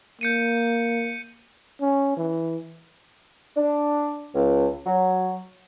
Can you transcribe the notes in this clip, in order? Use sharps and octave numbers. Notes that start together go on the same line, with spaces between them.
A#3 G6 C#7 D#7
C#4
E3
D4
C#2
F#3